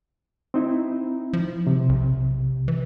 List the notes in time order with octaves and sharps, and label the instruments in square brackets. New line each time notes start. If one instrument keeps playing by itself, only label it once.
[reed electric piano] C4 D#4 E4
[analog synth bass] F3
[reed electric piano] C3
[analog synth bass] B1
E3